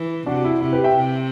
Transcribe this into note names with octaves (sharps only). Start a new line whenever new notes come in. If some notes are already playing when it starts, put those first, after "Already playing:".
Already playing: E3
C3 D4 F#4
E4
C3 E4
G4 B4
E5 G5
C3